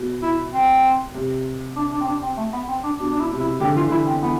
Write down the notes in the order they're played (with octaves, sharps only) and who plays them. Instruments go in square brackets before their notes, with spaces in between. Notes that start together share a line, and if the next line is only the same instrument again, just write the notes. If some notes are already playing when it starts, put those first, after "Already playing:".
Already playing: [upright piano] B2
[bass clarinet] E4
C4
[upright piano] C3
[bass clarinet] D4
D4
C4
D4
C4
A3
B3
C4
D4
[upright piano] B2 [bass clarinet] D4
[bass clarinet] D4
E4
[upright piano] C3
[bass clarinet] E4
[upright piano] D3 [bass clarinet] G4
[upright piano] E3 [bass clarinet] F4
[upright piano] D3 [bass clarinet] E4
[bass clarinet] C4
[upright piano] E3 [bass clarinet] B3